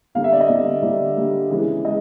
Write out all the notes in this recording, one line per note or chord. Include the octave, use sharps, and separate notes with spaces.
D3 G3 A#3 F5
E5
D5
D#5
D3 G3 A#3
D3 G3 A#3 D5
D3 G3 A#3
C#3 E3 G#3
G#3 D#5